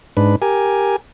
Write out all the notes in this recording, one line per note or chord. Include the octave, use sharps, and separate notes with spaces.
G#2 D4 B4
G4 A#4 G#5